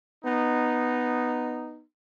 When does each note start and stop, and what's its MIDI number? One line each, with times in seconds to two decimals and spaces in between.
0.23 1.83 59
0.23 1.83 63